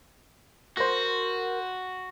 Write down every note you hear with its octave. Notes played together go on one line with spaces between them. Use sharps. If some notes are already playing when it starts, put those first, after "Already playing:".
F#4 A#4 C5 A#6